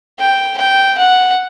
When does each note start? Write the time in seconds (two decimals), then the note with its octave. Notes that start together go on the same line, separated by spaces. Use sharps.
0.20 G5
0.58 G5
0.98 F#5